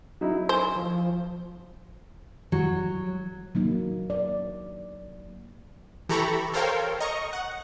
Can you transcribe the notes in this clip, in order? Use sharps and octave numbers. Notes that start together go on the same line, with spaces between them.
F#3 D#4 E4
C5 G#5
F3
F#3
F#3 A#3 D#4
D5
E3 G4 A4 A#5 B5 C#6
A4 A#4 C5 C#5 F5 G5
D#5 A#5 C#6
F#5